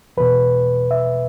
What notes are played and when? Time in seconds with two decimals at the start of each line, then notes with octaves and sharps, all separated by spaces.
0.17 E2 B2 B4
0.91 E5